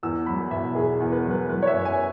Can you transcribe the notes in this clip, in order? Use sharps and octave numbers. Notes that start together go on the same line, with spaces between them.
E2 E6
F#3 B5
B2 E5
E2 G#4
E2
B4
F#3
B4
F#3 B4
C#5
E5
F#2
G#5